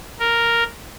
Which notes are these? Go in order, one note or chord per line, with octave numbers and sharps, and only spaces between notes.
A#4